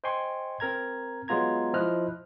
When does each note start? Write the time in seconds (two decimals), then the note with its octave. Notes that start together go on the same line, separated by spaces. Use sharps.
0.04 C5 D#5 G5 G#5 C6 C#6
0.60 C4 A#4 A#5 G#6
1.28 F#3 G#3 B3 F4 A#5 G#6
1.74 F3 E4 C5 D#5 F6 F#6